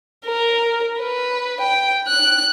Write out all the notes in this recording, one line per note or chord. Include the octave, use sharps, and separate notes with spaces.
A#4
B4
G5
F#6